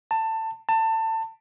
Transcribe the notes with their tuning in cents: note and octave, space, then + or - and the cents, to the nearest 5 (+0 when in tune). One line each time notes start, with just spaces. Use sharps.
A5 +20
A5 +25